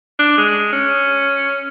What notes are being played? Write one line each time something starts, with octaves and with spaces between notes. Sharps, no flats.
D4
G#3
C#4